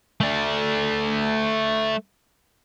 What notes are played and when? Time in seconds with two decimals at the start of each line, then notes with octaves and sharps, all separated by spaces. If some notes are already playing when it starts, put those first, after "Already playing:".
0.21 A3 D5